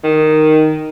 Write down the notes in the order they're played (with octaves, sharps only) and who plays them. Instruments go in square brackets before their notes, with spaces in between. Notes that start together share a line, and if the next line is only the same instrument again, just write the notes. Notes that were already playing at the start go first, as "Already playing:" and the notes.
[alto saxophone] D#3